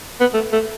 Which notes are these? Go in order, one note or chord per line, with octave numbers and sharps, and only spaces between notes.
B3
A3
A3